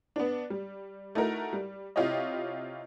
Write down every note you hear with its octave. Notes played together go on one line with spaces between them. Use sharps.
B3 D4
G3
A3 D#4 E4 F#4 A#4
G3
C3 E4 F4 G4 C#5 D#5